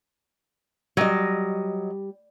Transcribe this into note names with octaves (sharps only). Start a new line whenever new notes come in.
F#3 G3 D#5